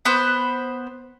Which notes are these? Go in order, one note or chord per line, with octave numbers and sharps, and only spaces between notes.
B3 B4 C5